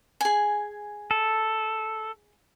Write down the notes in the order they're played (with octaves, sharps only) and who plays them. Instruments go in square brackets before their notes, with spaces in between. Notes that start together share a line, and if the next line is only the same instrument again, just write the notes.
[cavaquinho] G#4 G#5
[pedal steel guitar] A4